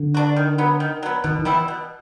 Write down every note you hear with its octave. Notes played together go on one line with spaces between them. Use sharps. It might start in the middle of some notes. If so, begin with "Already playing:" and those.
Already playing: D3
D4 F#4
D#3
F#3 B3
D#3
F#3 B3
B2 D#3
E3
G3 B3 E4
B2